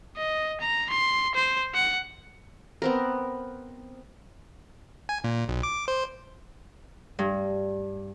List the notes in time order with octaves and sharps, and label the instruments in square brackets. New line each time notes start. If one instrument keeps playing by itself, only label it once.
[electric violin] D#5
A#5
C6
C5
F#5
[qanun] B3 C4 A#4
[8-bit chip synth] G#5
A#2
B1
D6
C5
[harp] G2